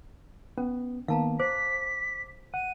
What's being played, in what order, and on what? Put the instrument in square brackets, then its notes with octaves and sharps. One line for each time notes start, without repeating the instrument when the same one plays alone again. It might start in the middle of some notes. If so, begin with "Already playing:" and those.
[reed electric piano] B3 [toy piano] C#4
[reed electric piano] D#3 A#3 B3 [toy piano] F5 A5 A#5
[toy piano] C5 [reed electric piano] D6 [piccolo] B6
[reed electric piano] F#5 [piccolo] D#7